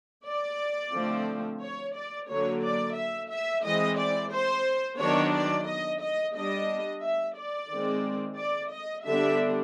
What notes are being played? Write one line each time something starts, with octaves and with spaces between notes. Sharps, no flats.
D5
D3 F3 A3 C4
C#5
D5
D3 F#3 A#3 C#5
D5
E5
E5
E3 G#3 C4 D#5
D5
C5
D#3 F#3 B3 D4 C#5
D5
D#5
D#5
G3 B3 D4 D#5
E5
D5
D#3 G#3 C4
D5
D#5
D3 G3 B3 D4 E5